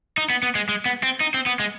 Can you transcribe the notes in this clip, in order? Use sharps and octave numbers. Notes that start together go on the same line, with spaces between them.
D#4
B3
B3
G#3
G#3
B3
C4
D#4
C4
B3
G#3